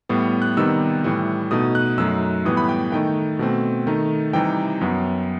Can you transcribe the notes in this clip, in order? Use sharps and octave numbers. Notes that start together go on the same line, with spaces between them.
A2 G3 B3
F#6
C3 D#3 G3 B3 D#4 E6
A2 E3 G3
B2 A3 D#4 D#6
F#6
F#2 F#3 A3 D#4 E6
A2 E3 G3 B3 D#6
B5
G5
D#3 A3 D#4 G5
B2 A3 C4
D#3 A3 D#4
C3 E3 G3 D#4 G5
F#2 F#3 B3